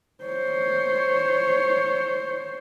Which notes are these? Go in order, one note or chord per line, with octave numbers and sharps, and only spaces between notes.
C5 C#5